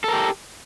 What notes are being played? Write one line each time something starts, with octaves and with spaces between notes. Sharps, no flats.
G4 A4 A#4